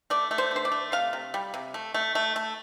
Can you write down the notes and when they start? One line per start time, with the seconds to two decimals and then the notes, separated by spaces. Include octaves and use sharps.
0.10 A3 D5
0.31 A3
0.38 C5
0.51 D3 C5
0.65 D5
0.72 A3
0.92 C3 F5
1.13 C3
1.34 G3
1.54 C3
1.74 A3
1.94 A3
2.15 A3
2.36 A3